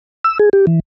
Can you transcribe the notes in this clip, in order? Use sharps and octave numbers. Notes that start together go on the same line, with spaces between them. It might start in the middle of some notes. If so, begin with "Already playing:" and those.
E6
G#4
G4
E3